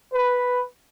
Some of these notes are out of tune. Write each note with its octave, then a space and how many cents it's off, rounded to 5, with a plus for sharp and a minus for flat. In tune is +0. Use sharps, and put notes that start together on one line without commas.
B4 +0